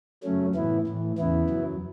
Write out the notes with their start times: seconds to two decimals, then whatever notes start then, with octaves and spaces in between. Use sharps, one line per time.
0.23 F#2 C#3 F#3 A3 C#4
0.55 A2 E3 B3 E4
0.87 A2 E3
1.18 E2 C#3 E3 B3 E4
1.50 F#2 F#3